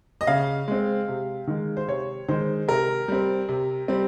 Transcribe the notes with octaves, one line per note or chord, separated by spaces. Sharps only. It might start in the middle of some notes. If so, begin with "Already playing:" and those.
D#5
C#3 F5
G#3 C4
C3
D#3 G#3
C5
C3 C#5
D#3 G#3 C5
C3 A#4
G3 C4
C3
G3 C4